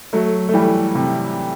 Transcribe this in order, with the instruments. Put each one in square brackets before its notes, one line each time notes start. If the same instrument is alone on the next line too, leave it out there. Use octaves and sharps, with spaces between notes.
[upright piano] F#3 A3
A3
E3 G3
C3